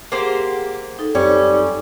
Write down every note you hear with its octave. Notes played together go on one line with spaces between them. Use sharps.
A#3 G4 G#4 C5 F#5
D#4 A4
F#2 G3 C4 C#4 C#6